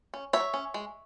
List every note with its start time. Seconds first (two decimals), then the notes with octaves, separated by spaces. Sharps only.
0.14 C#4
0.33 F#3 C#5 E5
0.54 C#4
0.74 G#3